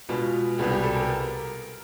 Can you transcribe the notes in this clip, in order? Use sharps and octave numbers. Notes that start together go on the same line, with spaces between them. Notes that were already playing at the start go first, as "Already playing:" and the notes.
B2 G#3 B3 F4
C2 B2 G3 B3 G#4
G4
A4
A#4